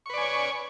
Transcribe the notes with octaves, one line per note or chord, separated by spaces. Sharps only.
B4 C#5 D5 G#5 C#6